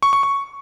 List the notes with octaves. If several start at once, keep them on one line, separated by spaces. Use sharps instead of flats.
C#6
C#6
C#6